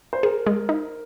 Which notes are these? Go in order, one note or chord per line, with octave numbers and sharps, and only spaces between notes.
C5
G#4 A#4
G#3
D#4